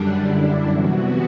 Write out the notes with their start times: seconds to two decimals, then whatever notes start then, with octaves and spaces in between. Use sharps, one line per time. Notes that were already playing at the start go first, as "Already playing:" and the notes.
Already playing: F#2 D3 G3 D4
0.18 E4
0.69 C3 E3 B3 F#4